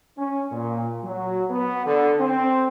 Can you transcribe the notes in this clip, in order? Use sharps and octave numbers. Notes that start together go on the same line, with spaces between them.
C#4
A#2
F#3
B3
D3
C4